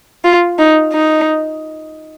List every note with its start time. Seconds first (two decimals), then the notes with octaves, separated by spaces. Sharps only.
0.24 F4
0.59 D#4
0.93 D#4